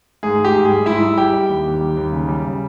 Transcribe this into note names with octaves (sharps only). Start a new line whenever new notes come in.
G#2 G#4
G#2
G4
G#2
G3 G#4
G#2 E4 E5
G3
G3 G4 G5
G3
D#2
D#2
G3
D#2
C#3
G3
C#3